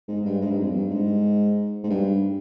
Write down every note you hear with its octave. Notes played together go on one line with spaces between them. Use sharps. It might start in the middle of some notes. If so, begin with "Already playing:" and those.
G#2
G2
G#2
G2
F2
G2
G#2
G#2
G2